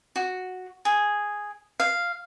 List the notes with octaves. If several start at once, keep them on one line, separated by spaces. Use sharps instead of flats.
F#4
G#4
F5